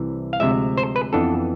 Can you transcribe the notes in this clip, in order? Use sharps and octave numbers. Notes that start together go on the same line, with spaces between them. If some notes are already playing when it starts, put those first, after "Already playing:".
Already playing: C2 C3 E3
F5
D2 C3 F3 G#3 E5
C5
B4
F2 E3 B3 D4 A4